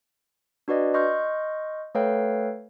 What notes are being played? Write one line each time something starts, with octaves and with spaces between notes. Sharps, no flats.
D4 F#4 B4 D5 D#5
D#5 C6 C#6 F6 G6
A3 A4 B4 C#5 F5 G5